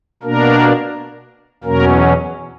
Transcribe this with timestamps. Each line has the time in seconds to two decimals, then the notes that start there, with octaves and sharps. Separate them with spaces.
0.23 B2 A#3 D4 A#4
1.64 E2 B2 F#3 A#3 C#4 A#4